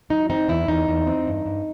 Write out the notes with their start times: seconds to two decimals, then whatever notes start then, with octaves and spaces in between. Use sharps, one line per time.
0.10 F#3 D#4
0.30 C4 D#4
0.48 E2 E4
0.68 E2 D#4
0.88 E2
1.07 C4
1.27 G2
1.46 G2